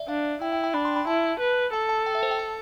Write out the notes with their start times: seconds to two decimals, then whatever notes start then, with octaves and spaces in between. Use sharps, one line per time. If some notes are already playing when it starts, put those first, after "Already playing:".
Already playing: D5 E5
0.08 D4 F5
0.42 E4 G5
0.52 G5
0.64 G5
0.74 D4 B5
0.85 C6
0.96 B5
1.07 E4 A5
1.40 B4
1.73 A4 A5
1.89 A5
2.06 G5
2.15 E5
2.23 C5
2.31 G5
2.39 A5